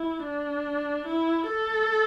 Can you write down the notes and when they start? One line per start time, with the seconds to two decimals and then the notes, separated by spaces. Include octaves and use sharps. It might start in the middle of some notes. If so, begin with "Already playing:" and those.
Already playing: E4
0.24 D4
1.06 E4
1.48 A4